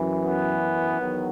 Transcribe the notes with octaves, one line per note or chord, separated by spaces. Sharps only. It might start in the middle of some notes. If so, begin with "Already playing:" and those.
Already playing: F#2 E3
B3
E2 D#3 F#3